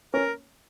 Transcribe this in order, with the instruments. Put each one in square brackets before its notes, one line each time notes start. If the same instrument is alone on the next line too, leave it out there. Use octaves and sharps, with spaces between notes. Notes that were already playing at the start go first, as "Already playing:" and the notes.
[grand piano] C#4 [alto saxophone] A#4